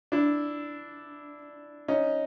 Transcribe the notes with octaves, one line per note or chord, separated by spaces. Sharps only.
D4 E4
C#4 D#4